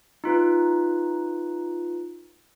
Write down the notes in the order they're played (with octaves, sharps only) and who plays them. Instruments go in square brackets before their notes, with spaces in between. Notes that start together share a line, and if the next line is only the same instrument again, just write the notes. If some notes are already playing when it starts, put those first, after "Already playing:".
[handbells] D#4 F4 B4